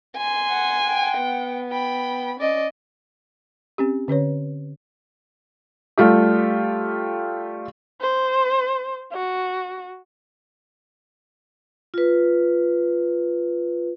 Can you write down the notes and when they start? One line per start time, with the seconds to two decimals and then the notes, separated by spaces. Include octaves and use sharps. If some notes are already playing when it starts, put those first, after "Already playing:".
0.17 G#5 C6
0.49 F#5
0.85 F#5 G5
1.19 B3
1.71 G5 B5
2.40 C#4 D5 D#5
3.78 C4 C#4 G4
4.08 D3 C#4 B4 C#5
5.98 G3 A3 F4 G4
8.01 C5
9.13 F#4
11.94 F4 B4